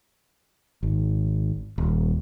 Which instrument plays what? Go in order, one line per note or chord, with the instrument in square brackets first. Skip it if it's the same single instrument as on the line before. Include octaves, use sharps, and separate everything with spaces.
[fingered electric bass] G#1
D#1